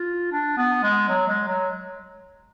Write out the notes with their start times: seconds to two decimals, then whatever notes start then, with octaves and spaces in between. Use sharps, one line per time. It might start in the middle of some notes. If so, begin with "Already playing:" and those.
Already playing: F4
0.32 D4
0.57 B3
0.83 G#3
1.09 F#3
1.27 G#3
1.48 F#3